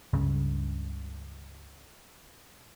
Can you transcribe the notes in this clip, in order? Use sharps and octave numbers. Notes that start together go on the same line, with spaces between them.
C#2 G2 C#3